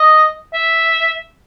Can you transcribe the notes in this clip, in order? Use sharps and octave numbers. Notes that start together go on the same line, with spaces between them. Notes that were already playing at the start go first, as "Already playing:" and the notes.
Already playing: D#5
E5